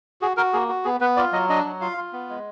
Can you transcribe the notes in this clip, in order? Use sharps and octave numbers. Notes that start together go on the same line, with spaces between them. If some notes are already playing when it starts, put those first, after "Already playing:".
F#4 G#4
F#4 A#4
A#3 G#4
F#4
B3 G#4
B3 B4
F4 D5
F#3 D#5
D4 D#5
F#3
F4 F5
F4
B3
G#3